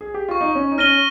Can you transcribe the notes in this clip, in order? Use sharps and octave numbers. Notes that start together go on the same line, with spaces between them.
G#4
G4
F4 C#6
D#4
C#4
D#4
C#4 F6 A#6 D#7 G7